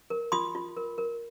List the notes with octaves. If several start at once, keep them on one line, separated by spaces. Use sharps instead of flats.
A#4
F4 C6 D#6
F4
A#4
A#4